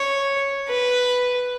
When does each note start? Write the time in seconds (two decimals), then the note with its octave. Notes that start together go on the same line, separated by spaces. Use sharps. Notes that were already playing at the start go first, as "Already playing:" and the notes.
Already playing: C#5
0.68 B4